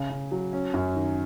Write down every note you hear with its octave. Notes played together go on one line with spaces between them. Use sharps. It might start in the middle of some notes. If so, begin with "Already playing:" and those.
Already playing: C#3
C#3
F#3
C#4
F#2
D#3